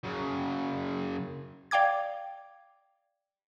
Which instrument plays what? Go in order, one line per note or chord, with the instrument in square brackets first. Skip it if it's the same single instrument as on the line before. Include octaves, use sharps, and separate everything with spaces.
[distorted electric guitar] F#2 C#3
[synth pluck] D5 F5 G5 D6 G#6